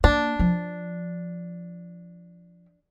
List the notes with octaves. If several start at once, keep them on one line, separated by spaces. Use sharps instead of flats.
A#3 D4
F3